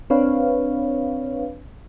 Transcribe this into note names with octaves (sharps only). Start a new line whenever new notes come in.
C4 D4 B4 C#5 F5